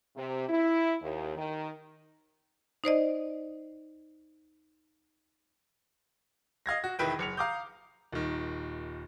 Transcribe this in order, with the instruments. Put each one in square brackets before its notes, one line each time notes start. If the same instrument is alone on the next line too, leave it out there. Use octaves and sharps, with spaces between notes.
[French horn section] C3
E4
D#2
D#3
[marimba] D#4 C5 D5 D#5
[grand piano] D#5 F5 G#6 A#6
F#4
E1 D#3 E4 B4 G5
F#1 C#7 F7
F5 A#5 D6 D#6 G6
D#1 D#3